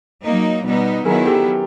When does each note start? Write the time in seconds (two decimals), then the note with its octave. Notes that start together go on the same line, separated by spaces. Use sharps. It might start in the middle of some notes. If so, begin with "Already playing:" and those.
0.22 F#3 A#3 D#4
0.63 B2 G3 B3 D#4
1.05 D#3 F#3 B3 E4 G#4 A#4
1.26 G4 A4